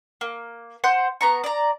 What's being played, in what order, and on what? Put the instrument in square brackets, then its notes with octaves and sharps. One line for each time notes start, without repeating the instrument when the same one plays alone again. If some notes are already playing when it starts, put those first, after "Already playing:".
[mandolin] A#3
C5 F#5 C6 G6
B3 A#5 C#6
D5 A#5